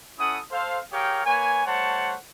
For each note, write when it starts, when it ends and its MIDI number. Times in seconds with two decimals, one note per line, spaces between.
0.19 0.39 61
0.19 0.39 64
0.19 0.39 69
0.19 0.39 78
0.19 0.39 87
0.51 0.78 69
0.51 0.78 72
0.51 0.78 77
0.92 1.21 67
0.92 1.21 68
0.92 1.21 70
0.92 1.21 73
0.92 1.21 77
0.92 1.21 79
1.26 1.65 58
1.26 1.65 71
1.26 1.65 73
1.26 1.65 80
1.66 2.15 55
1.66 2.15 57
1.66 2.15 72
1.66 2.15 73
1.66 2.15 78
1.66 2.15 81